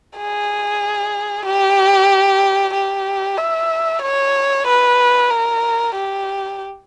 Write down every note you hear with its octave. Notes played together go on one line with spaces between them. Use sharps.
G#4
G4
G4
E5
C#5
B4
A#4
G4